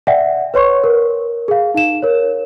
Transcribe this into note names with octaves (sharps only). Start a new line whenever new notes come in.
D5 E5 F#5 G5
B4 C#5 C6 C#6
A#4
G#4 F5
D#4 F5 E7
A#4 C#5